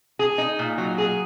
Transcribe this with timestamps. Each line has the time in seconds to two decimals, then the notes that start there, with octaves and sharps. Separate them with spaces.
0.19 G#4
0.38 D#4
0.59 A#2
0.78 F#3
0.98 G#4